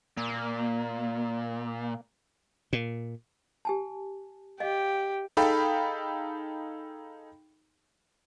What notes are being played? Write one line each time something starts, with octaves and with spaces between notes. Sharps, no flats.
A#2 A#3
A#2
G4 G#5 A5
G4 D#5 F5
D#4 G#4 A4 F5 G5 B5